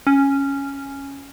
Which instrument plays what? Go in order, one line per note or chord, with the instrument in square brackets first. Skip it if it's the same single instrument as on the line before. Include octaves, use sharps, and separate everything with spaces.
[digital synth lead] C#4